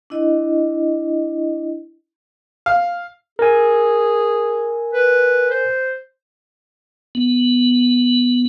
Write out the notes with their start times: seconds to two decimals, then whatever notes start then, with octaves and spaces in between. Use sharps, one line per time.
0.10 D4 E4 D#5
2.66 F5
3.39 G#4 A#4 G#5
4.93 B4
5.51 C5
7.15 B3